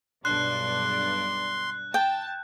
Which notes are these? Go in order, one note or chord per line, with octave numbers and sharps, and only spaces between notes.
B1 G2 D4 C6 F#6
G5 A5